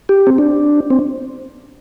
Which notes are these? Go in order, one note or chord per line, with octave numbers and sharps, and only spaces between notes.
G4
C4
D4
C4